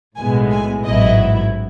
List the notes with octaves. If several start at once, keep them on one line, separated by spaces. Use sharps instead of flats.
B1 A2 G#3 B3 E4 G#5
G#5
A1 G#2 F#3 B3 E4 D#5